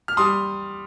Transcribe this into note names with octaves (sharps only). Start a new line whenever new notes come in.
F6
G3 C6 D#6